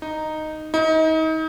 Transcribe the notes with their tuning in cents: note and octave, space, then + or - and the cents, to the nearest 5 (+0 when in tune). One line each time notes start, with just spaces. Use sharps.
D#4 -5
D#4 +35